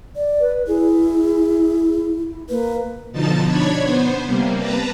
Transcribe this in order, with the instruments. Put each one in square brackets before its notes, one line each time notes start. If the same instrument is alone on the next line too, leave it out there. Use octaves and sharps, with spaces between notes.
[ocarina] D5
[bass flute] B4
[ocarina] E4 [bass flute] G#4
[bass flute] E4
[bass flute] A#3 [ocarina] B4
[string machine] B2 D3 F3 D#4 A5 A6
D4 C#5 B5 G#6
B3 C5
C3 G3 A#3
B4 A5 A#5